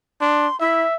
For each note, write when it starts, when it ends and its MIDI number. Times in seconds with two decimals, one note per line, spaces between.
0.21 0.48 62
0.21 0.58 84
0.60 0.84 64
0.60 0.97 76